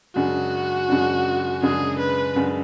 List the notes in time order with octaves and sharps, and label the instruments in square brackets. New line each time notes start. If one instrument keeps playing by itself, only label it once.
[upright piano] F#2 C#3 G#3 D4 [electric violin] F#4
[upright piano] F#2 C#3 G#3 D4
[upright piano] F#2 C#3 G#3 D4 [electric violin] G#4
[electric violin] B4
[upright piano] F#2 C#3 G#3 D4